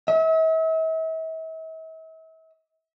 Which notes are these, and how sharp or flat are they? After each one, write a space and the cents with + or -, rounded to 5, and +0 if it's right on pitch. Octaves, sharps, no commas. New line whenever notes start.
E5 -45